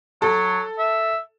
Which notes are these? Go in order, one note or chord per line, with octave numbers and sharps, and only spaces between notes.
F#3 A4
E5